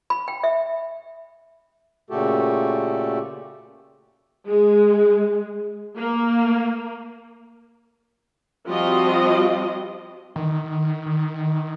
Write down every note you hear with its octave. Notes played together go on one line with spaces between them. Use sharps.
B5
G5
E5
A#2 C#3 A3 F#4 G4 A4
G#3
A#3
F3 G3 C4 F4 F#4 D#5
D#3
D#3